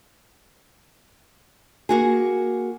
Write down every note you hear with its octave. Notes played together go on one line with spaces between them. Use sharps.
A#3 F#4 G#4